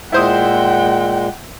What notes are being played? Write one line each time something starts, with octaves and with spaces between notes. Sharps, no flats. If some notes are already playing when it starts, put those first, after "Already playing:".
A#2 G#3 E4 C5 F#5 G5 D#6